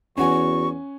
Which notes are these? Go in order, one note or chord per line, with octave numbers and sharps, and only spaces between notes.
E2 C#4 F#4 F#5 G#5 C#6